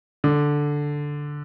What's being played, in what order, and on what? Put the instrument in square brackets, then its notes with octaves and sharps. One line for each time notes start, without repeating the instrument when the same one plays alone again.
[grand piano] D3